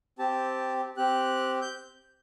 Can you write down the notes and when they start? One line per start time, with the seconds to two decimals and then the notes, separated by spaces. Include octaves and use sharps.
0.19 C4 G4 A5
0.97 C4 G4 F#6
1.62 G6